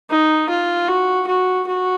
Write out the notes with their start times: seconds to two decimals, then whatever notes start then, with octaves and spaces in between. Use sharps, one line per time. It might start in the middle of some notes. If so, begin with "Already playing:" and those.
0.10 D#4
0.50 F4
0.88 F#4
1.27 F#4
1.67 F#4